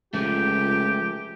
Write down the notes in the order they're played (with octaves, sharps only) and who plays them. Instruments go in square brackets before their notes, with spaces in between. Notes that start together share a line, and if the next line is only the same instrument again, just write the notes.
[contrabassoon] C#2 [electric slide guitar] F3 A3 [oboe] G4